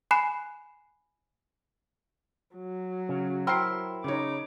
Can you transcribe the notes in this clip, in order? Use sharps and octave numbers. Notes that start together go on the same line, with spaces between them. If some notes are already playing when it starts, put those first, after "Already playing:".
G#5 B5 F#6 C7 E7
F#3
C#3
E4 A#4 C5 G5 C6 C7
C#3 D#4 C#5 D6